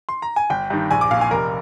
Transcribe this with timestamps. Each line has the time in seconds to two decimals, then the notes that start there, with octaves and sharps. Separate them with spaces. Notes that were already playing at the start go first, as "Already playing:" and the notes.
0.09 C6
0.22 A#5
0.36 G#5
0.50 G1 G5
0.70 G2 D#3
0.91 A#1 G#5
1.01 D6
1.11 A#2 F5
1.21 G#5
1.31 F1 A#4